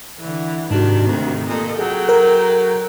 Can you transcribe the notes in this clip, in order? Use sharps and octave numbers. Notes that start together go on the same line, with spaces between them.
D3 E3
G#2 C3 D#3 D4 F#4
D2 C4
A#2 A4 D#5
F#3 G#4 A4 G5
A#4